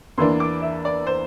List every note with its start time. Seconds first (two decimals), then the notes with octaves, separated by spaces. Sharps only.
0.18 E2 E3 A#3 D4 C6
0.40 D6
0.62 E5
0.85 D5
1.07 C5